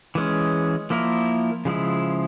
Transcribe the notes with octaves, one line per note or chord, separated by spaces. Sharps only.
E3 G#3 C#4
F3 A#3 E4 A#4
C#3 F3 G#3 E4